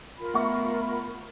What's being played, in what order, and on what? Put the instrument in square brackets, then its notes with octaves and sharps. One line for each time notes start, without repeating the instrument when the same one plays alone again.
[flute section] F4 A#4 B5
[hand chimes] A3 B3 E5 [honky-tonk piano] F#5 C#6